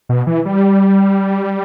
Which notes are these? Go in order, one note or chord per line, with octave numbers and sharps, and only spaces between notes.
B2
E3
G3